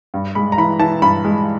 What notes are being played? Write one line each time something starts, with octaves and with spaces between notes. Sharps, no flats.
G2
G#3 B5
A#5
E3 B5
E3 A5
G2 B5
G#3